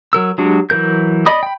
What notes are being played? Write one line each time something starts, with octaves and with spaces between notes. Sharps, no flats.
F#3 A#4 E6
F#3 G#3 D4 F#4 G4
E3 F#3 A#4 G6
D5 D#5 B5 D#6
G5 B5